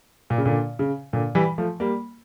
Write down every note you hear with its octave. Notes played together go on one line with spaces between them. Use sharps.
A#2
C#3
A#2 D3
C#3
A#2 D3
E3 G3
F3 A3
G3 A#3